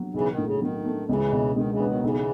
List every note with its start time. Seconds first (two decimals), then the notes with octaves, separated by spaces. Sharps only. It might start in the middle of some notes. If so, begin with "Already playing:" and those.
Already playing: F#3
0.14 B1 C#3 E3
0.31 D#3
0.38 A2
0.46 C#3
0.61 D#3 F#3
0.85 A3
1.09 C#2 C#3 E3
1.33 B2
1.56 D#3 G#3
1.72 C#3 E3
1.80 B3
1.87 D#3 F#3
2.03 B1 C#3 E3